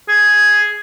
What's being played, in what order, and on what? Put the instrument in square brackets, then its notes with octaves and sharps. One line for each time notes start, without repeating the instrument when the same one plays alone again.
[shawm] G#4